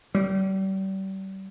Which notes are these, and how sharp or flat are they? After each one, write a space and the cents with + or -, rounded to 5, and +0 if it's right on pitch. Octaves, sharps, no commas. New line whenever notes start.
G3 -35